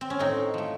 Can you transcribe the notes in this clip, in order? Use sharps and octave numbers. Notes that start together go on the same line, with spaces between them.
C4
C#4
A2 C4 D#4
F3 A3